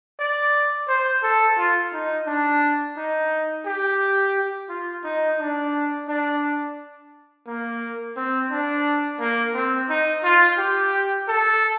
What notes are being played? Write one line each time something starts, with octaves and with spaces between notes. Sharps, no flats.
D5
C5
A4
F4
D#4
D4
D#4
G4
F4
D#4
D4
D4
A#3
C4
D4
A#3
C4
D#4
F4
G4
A4